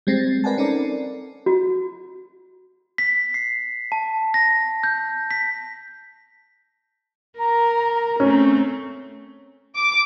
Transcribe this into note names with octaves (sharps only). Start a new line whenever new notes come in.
G3 G#3 C4 A6 A#6 C7
A#4 B4 D5 F#5 G#5 A5
C4 C#4 D#4 A4 A#4 D5
F#4
B6
C7
A5
A#6
G6
B6
A#4 A#5
A3 C4 C#4
D6